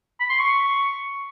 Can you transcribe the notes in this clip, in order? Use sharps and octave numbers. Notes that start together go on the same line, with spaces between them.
B5
C6
C#6